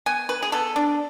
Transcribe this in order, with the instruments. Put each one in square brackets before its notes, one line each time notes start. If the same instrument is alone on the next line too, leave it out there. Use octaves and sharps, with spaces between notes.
[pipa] B3 G#5
B4
G#4
B3 A4
D4